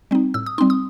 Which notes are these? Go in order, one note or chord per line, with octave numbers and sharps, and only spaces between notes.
G3 C4 D#4
A2 E6
D#6
G3 C4 D#4 C6
D#6